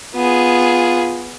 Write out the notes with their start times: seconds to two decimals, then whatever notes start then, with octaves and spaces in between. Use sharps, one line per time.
0.15 B3 F4 G#4